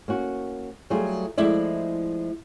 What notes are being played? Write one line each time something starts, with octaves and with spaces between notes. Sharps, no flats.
A#3 C#4 F#4
F#3 G3 A3 F4 G#4
F3 G#3 A3 E4 D5